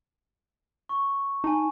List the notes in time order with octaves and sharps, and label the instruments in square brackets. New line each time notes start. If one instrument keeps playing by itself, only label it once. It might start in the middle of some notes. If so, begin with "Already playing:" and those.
[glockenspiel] C#6
[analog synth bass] D#4 [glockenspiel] G#5 A5